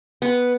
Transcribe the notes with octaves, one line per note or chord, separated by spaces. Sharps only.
B3